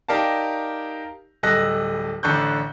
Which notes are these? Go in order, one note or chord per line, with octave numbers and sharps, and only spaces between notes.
D#4 G4 A#4 D5 F5 A5
D1 G3 A4 D#5 F#6 A#6
A1 D3 D4 C#6 F#6 G6